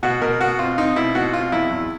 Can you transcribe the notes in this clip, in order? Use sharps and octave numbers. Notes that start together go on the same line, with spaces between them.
B2 F#4
B2 A#4
B2 F#4
C4 F4
C4 D#4
B2 E4
B2 F#4
C4 F4
E2 E4
E2